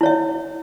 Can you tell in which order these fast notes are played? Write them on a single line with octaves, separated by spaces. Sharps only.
E4 C#5 E5